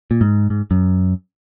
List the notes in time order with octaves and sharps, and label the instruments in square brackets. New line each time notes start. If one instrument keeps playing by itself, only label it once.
[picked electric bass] A#2
G#2
G#2
F#2